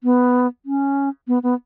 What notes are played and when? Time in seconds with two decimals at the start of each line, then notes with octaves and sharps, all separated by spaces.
0.04 B3
0.66 C#4
1.28 B3
1.43 B3